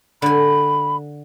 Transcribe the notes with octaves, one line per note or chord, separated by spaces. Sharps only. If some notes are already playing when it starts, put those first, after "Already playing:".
D3 G#5 B5